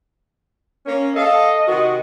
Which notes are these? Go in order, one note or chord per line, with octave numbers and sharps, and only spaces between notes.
A#3 C#4
A4 D#5 F5
C3 D#3 F#4